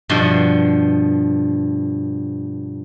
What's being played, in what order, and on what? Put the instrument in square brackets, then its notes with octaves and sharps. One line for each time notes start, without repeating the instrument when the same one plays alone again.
[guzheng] G2 B2 F3